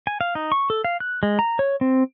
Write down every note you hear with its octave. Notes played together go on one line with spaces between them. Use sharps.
G#5
F5
D#4
C#6
A4
F5
F#6
G#3
A#5
C#5
C4